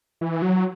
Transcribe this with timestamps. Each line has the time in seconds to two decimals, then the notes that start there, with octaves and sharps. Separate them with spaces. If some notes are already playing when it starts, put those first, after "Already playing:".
0.21 E3
0.42 F#3